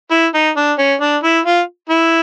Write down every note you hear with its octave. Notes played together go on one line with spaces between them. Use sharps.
E4
D#4
D4
C#4
D4
E4
F4
E4